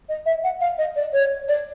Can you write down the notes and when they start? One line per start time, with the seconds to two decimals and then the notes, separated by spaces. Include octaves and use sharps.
0.09 D#5
0.26 E5
0.44 F#5
0.61 F5
0.78 D#5
0.96 D5
1.13 C#5
1.48 D5